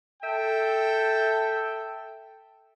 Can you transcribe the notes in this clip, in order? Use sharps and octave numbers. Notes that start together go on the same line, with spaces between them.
A4 E5 G5